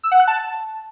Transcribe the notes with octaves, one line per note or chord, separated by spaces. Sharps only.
E6
F#5
F#6
A5